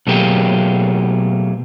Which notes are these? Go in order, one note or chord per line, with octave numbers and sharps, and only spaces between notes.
B2 F#3 A3 A#3 G4 G#4